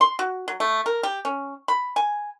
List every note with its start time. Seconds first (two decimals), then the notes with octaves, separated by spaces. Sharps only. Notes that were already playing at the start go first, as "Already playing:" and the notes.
0.01 C6
0.19 F#4
0.48 F#3
0.60 A3
0.86 A#4
1.03 G4
1.25 C#4
1.68 B5
1.96 G#5